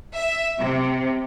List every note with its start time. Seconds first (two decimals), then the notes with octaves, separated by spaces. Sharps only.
0.15 E5
0.58 C3